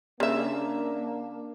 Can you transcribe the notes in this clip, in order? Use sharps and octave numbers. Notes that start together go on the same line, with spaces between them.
C#3 A#3 D4 E5